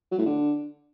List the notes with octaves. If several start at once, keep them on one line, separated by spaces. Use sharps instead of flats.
F#3
A2
D3